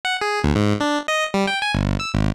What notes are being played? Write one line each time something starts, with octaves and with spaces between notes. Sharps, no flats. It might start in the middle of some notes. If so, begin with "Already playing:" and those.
F#5
G#4
D2
G#2
D4
D#5
G3
G5
G#5
G1
E6
G#1